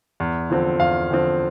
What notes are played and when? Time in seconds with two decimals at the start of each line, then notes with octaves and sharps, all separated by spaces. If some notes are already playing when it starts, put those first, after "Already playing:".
0.20 E2
0.50 D3 F3 C4
0.80 E2 F5
1.10 D3 F3 C4